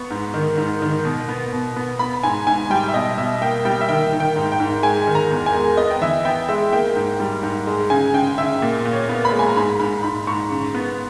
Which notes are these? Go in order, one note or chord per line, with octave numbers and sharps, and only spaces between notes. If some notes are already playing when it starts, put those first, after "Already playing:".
Already playing: B3 C#6
G#2
D#3
G#2
D#3
B2
B3
B2
B3
B3 B5
G#2 G#5
G#2 G#5
G3 G5
E5
B2 D#5
B2 E5
A#3 G5
G3 G5
E5
D#3 G5
D#3
G5
G#2
G5
G#2
G#3 G#5
D#3
A#5
E2
G#5
G#3
B3 D#5
G5
E3 E5
B3 G5
G#3 E5
A#3 G5
G#2
G3
G#2
G#3
C#3 G#5
C#3 G5
C#3 E5
A#2
A#2
C#5
B3
B5
G#3
G#5
A#5
G#2 B5
G#2 B5
G#2 B5
G#2 C#6
C#3
B3